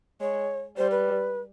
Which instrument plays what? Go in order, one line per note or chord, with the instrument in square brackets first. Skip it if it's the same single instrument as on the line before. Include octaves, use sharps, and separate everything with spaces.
[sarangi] G#3 [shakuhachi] C#5
[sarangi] G3 [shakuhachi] C5
[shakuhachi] B4